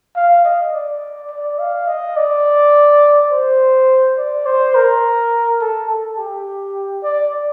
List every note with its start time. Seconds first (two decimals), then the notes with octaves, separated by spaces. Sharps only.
0.16 F5
0.45 D#5
0.73 D5
1.30 D5
1.59 F5
1.88 D#5
2.17 D5
3.31 C5
4.18 D5
4.46 C5
4.75 A#4
5.61 A4
5.89 A4
6.18 G4
7.03 D5